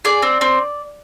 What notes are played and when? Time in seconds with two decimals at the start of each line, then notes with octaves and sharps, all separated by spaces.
0.05 G#4 D5
0.22 C4
0.41 C4